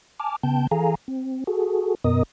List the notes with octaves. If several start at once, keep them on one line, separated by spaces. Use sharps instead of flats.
G#5 A5 D6 F6
C#3 B3 G5 A5 G6
E3 G#4 A4 F5 G#5 A#5
C4
F#4 G#4 A4
F#2 B2 B3 A#4 D#5 D#6